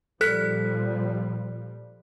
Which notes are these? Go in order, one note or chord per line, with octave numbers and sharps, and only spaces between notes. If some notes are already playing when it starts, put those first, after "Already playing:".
A#2 F3 G3 A4 F#6 B6